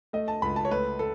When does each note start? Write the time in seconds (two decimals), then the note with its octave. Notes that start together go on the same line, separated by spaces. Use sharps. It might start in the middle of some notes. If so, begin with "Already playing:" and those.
0.13 A3 D#5
0.28 A5
0.42 C#2 B5
0.56 A5
0.65 C#5
0.71 A3 B4
0.99 A4